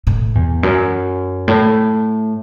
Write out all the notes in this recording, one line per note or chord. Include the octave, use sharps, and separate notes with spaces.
A2
E2
F#2
A2